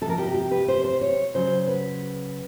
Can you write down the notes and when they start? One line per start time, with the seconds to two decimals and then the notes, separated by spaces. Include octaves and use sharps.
0.01 C3 A4
0.06 F3 A#4
0.18 G4
0.26 F#4
0.34 G4
0.52 B4
0.68 C5
0.84 C5
1.01 C#5
1.34 C#3 F#3 C5
1.68 B4